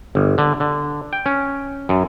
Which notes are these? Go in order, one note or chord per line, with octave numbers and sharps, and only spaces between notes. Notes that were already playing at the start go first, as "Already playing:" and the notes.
G1
D3
D3
G5
C#4
F#2